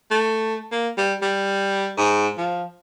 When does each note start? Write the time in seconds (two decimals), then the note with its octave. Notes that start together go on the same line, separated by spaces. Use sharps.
0.11 A3
0.72 A#3
0.98 G3
1.22 G3
1.98 G#2
2.38 F3